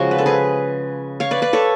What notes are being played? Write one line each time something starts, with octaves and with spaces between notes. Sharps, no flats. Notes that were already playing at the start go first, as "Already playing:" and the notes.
Already playing: C#3 F3 G#3 F#4
B4
A4
G#4 B4
C#5 F5
B4 D5
B4 D5
A4 C#5